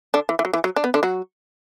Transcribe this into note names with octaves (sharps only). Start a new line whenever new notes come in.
D3 D4
E3
E3
F#3
E3
F#3
D4
B3
D3 D4
F#3 F#4